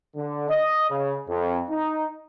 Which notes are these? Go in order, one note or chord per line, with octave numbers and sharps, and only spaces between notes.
D3
D#5
C#3
F2
D#4